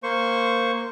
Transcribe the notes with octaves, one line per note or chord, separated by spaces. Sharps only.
A#3 C5 C#6